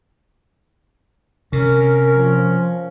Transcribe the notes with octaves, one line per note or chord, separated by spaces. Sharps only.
C3 C#4 A#4
F3